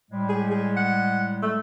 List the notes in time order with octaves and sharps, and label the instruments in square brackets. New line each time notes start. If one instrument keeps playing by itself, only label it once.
[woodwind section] A2 G3 G#3
[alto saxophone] G#4
G#4
F#5
A3